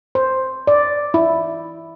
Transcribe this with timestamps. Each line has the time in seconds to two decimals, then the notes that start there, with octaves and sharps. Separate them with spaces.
0.15 C5
0.67 D5
1.14 E4